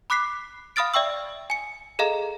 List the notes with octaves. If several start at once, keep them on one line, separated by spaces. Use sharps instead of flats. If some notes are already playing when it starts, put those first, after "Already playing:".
B5 D6 F#6 B6 C7
F5 B5 D#6 F6 A6 D7
D5 E5 G5 C#6 E6
G#5 C#7
G#4 A4 D#5 F5 A#5